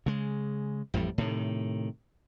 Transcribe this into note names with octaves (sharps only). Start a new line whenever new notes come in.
C#3 G#3
A1 F2 A2 G3
A2 C3 D#3